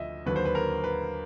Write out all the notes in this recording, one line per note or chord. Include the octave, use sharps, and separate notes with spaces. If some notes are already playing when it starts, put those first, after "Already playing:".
Already playing: D2 F3 D#5 E5
D#2 D3 F#3 B4
C5
B4
A#4
B4